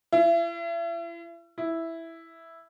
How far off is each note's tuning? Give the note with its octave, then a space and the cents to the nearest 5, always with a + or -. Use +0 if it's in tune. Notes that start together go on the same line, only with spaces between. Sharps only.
E4 +40
E4 +0